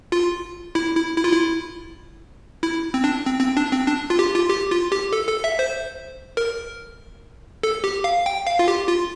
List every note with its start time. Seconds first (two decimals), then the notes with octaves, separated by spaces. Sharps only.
0.12 F4
0.75 E4
0.96 E4
1.17 E4
1.24 F4
1.32 E4
2.63 E4
2.94 C4
3.04 D4
3.25 C4
3.40 C4
3.57 D4
3.72 C4
3.87 D4
4.10 F4
4.19 G4
4.35 F4
4.50 G4
4.71 F4
4.92 G4
5.13 A4
5.28 A4
5.44 E5
5.59 C5
6.37 A#4
7.63 A4
7.84 G4
8.04 F5
8.26 G5
8.47 F5
8.59 F4
8.68 G4
8.87 F4